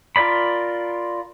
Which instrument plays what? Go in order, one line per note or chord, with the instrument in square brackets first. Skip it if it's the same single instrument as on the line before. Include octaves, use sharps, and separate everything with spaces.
[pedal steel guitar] F4 A#4 D5 B5